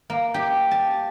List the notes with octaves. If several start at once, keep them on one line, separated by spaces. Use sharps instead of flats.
A#3
G4
A5